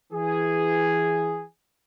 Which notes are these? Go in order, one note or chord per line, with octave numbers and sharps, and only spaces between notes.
E3 G#4